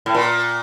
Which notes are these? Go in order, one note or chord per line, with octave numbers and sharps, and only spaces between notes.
A2
A#2